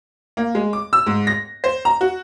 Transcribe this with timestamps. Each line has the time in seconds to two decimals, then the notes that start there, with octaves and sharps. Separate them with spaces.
0.37 A#3
0.55 G#3
0.73 D6
0.93 E6
1.07 G#2
1.27 A#6
1.64 C5
1.85 A#5
2.01 F#4